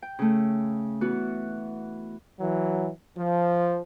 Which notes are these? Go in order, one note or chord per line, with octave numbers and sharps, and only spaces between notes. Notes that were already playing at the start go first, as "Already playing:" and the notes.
G5
C#3 A3
E3 B3 F#4
E3 F#3
F3